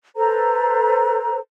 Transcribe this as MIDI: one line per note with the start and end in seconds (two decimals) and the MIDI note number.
0.16 1.38 69
0.16 1.38 71
0.16 1.38 72
0.16 1.38 82